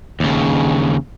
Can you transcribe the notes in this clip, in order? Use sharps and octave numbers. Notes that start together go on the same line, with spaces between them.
D#2 C#3